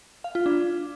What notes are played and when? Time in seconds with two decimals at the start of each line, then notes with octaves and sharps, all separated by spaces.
0.24 F5
0.35 F4
0.46 D4